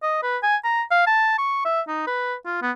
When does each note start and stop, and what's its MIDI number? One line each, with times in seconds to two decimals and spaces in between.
0.03 0.21 75
0.23 0.38 71
0.43 0.56 80
0.64 0.82 82
0.91 1.04 77
1.07 1.38 81
1.38 1.65 85
1.65 1.81 76
1.88 2.05 63
2.07 2.35 71
2.45 2.61 65
2.62 2.71 59